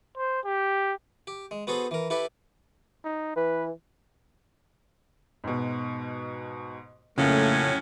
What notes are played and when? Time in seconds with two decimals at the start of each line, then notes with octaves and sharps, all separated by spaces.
0.17 C5
0.45 G4
1.27 G4
1.51 G#3
1.67 B3 F#4 G#4 A4 C5
1.91 E3 A#4
2.10 E4 G4 A4 B4
3.04 D#4
3.36 E3 B4
5.44 G#2 B2
7.18 F2 A2 C#3 F#3 A3 A#3 C#4